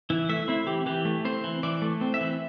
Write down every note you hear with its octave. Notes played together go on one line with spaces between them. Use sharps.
E3 E4
A3 E5
C4 E4
E3 G4
E3 G4
A3
C4 C5
E3
E3 D5
A3
C4
E5
E3